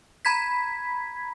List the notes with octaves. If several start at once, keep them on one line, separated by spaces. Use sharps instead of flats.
A#5 B5 G#6 B6